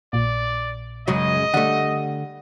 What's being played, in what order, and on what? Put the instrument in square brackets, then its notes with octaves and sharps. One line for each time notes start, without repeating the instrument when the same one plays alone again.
[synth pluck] A#1 A#2 [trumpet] D5
[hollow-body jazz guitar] C#2 F#3 [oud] F#2 C#3 G#3 [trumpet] D#5
[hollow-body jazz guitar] D3 A3 [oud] G3 [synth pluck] F#5